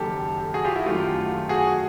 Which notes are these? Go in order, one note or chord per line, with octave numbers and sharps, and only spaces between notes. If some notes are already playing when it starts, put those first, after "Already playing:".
Already playing: F#1 F#2 D#3 G4 A4
F#4 G#4
F4 G4
E4 F#4
F#2 D#3 F#3 A3 F4 G4
F#4 G#4